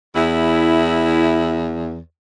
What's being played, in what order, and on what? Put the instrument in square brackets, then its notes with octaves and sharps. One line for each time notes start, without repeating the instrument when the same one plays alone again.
[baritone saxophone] E2 [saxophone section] E4